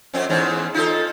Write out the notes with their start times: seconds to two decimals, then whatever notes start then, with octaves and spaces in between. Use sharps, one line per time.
0.14 F2 C4 C#4
0.29 E2 G#2 C#4
0.74 D#4 F4 A4